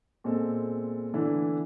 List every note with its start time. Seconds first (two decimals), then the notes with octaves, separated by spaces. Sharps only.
0.24 A#2 G#3 B3 C4 A4
1.14 D3 E3 A3 B3 D4 E4